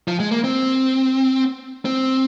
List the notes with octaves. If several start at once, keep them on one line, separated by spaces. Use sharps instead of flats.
F3
G#3
A#3
C4
C4